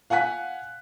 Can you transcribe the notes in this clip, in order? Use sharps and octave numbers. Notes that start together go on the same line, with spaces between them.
F5 F#5 G#5 F#6 B6